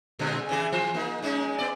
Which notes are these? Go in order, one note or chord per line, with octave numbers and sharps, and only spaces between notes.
A#2 D3 G#3
C#3 E3 G#4
E3 C5
A#3 D#4
G#3 C#4 D#4
B3 D5